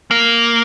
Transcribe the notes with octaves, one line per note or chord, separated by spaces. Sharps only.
A#3